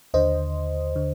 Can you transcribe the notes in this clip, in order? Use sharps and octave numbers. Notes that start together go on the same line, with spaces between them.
D#2 D3 C5 D#5
D3